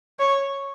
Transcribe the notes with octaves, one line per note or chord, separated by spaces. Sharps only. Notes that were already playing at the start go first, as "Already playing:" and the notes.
C#5